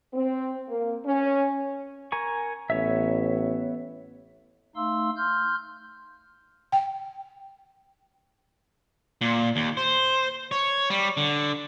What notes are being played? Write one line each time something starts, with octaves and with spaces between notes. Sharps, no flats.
C4
A#3
C#4
A#4 G#5 C#6
A1 B3 C#5 E5
A3 D#4 F5 C6 E6
C6 F6 G6
G5
A#2
D#2
C5
C#5
G3
D3